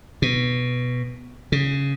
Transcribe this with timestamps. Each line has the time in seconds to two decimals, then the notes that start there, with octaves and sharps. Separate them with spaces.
0.22 B2
1.52 C#3